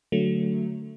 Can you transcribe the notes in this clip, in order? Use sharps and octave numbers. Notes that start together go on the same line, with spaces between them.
D3 F#3 A3